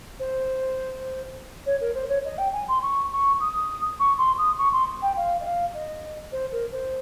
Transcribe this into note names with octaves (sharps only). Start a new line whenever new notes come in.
C5
C#5
A#4
C5
C#5
D#5
G5
G#5
C6
C#6
C#6
D#6
C#6
C6
D#6
C#6
C6
G5
F5
D#5
F5
D#5
C5
A#4
C5